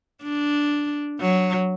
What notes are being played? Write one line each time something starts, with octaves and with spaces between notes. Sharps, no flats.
D4
F#3